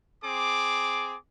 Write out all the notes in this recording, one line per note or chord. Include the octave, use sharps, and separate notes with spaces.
C4 G#4 D6